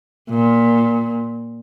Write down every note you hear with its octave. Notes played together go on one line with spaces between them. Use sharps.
A#2